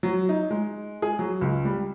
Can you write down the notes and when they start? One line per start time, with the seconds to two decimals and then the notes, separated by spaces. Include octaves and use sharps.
0.03 F#3
0.29 D#4
0.50 G#3
1.02 G#4
1.19 F#3
1.41 C#2
1.65 G3